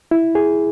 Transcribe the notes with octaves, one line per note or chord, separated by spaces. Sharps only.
E4
G#4